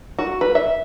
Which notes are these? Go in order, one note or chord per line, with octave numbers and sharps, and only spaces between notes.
F#4
B4
E5